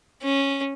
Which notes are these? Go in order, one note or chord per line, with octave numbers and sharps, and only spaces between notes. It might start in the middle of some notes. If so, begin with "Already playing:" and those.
C#4